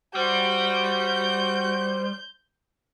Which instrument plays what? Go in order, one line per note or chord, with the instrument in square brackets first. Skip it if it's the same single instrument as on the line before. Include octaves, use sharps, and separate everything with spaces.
[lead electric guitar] G3 [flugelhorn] F#4 [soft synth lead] C5 [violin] G6